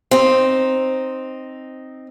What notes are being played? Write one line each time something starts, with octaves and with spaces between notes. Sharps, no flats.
C4 D#4